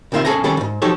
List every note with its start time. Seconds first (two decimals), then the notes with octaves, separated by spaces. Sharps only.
0.12 C#2 C3 D#3 A#3 F4 E5
0.25 B1 C#4 G#4 A4 G#5 A#5
0.44 D#3 G3 C#4 A4 D5
0.57 D2 G#2
0.82 F3 F#3 D#4 G4 A4 C#5